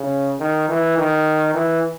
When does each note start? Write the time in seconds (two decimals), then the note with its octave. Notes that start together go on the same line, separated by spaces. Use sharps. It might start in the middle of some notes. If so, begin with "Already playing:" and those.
Already playing: C#3
0.39 D#3
0.68 E3
0.98 D#3
1.54 E3